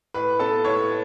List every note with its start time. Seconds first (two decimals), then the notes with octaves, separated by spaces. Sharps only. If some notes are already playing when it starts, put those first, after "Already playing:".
0.14 A2 B4 B5
0.39 B3 A4 A5
0.64 A2 C#5 C#6